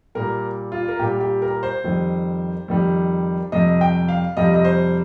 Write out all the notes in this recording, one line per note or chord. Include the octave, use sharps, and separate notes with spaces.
A#2 G3 A#4
F4
A#4
A#2 G3 G4
G4
A#4
C5
F2 D#3 G3
F2 D#3 G3
F2 C3 G3 D#5
G5
F5
F2 C3 G3 D#5
D#5
C5